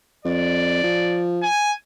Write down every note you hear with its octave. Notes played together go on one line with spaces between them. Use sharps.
F2 D5
F3
G#5